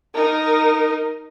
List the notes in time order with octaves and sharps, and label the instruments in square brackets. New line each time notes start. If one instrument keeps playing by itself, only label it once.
[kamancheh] D#4 A#4